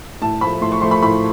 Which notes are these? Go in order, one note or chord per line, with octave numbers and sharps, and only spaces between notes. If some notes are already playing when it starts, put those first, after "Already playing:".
A2 A5
F3 A3 B5
A2 C6
C#6
F3 A3 C6
B5
A2 B5